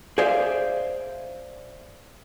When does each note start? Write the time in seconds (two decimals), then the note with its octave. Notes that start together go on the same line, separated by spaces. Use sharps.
0.18 G#4 C5 D5 E5 F5